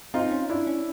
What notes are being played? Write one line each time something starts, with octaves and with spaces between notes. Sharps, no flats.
C4 D#4 F4
C#4
D4 E4
C#4